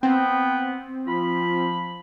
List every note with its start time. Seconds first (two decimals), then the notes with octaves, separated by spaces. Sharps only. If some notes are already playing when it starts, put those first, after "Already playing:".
0.03 B3 C4 G5
1.07 F3 F4 B5